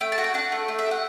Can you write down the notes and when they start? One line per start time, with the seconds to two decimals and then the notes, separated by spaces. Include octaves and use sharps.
0.01 A3 G5
0.12 A5
0.18 F#4 F#5
0.24 G5
0.34 D4 F#5
0.52 A3
0.68 A3
0.79 E5
0.86 G4
0.91 F#5